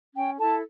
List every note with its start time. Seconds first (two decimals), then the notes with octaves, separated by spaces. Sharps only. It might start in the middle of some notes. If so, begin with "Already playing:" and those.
0.15 C#4 G5
0.39 E4 A4 A5